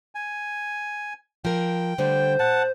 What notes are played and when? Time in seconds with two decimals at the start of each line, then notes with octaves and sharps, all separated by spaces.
0.15 G#5
1.45 F3 A#4 G5
1.98 D3 G3 A3 C5
2.39 A#2 F#5 A5